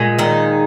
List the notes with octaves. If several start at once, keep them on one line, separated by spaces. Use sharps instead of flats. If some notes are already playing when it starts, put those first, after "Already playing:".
Already playing: A#2 G#3
D#3 D#4